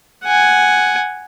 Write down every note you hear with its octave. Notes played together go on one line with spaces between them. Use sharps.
F#5 G#5